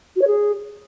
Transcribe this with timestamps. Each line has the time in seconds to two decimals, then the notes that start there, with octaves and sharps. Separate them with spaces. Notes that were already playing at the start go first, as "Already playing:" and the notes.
0.15 F#4
0.21 C#5
0.27 G#4